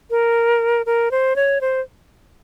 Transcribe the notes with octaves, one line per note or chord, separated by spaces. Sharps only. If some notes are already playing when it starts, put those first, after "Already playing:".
A#4
A#4
C5
C#5
C5